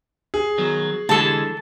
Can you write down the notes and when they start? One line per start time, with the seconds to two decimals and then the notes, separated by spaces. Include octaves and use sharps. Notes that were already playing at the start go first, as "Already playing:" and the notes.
0.34 G#4
0.58 D#3 F#3 B3
1.09 D3 E3 G#3 A4 A5